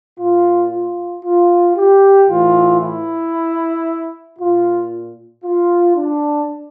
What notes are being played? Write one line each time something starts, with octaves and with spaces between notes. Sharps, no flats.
A#2 F4
F4
F4
G4
A2 E3 F4
E4
A#2 F4
F4
D4